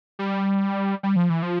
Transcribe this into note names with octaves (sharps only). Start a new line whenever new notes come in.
G3
G3
F3
E3
F3